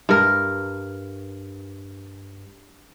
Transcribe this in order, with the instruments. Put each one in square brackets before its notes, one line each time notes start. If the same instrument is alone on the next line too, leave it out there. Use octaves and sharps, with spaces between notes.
[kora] G2 A#4